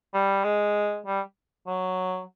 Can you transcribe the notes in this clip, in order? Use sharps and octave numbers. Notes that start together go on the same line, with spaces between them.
G3
G#3
G3
F#3